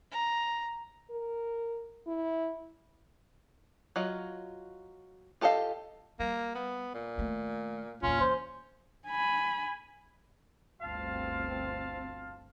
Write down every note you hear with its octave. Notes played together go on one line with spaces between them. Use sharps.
A#5
A#4
E4
F#3 F4 D#5
F4 G4 A4 D#5 F5
G3 A#3
B3
A#2
D#3 A3
E2 A#2 C#4 F4
E3 C5
G#5 B5
G1 D2 C4 F4 F5 A5